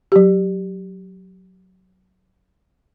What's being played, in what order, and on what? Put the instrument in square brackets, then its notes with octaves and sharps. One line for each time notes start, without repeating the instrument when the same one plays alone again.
[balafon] F#3 G4